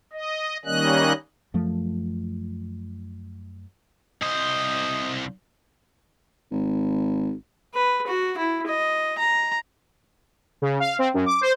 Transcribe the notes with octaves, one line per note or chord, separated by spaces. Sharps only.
D#5
D#3 G3 A#3 C#4 D#5 F#6
F#2 F3 A3
C2 C5 D#5
G#1
B4
F#4
E4
D#5
A#5
C#3
F5
C4
F#2
D6
C5